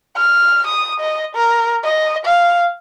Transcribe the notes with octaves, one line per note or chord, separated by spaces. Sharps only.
F6
D#6
D#5
A#4
D#5
F5